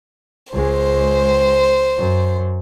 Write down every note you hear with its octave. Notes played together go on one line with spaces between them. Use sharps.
C#2 G#3 C5
F#2